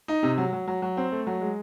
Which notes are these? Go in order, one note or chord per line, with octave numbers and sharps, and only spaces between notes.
D#4
C3
F#3
F#3
F#3
F#3
C4
A3
F#3
G#3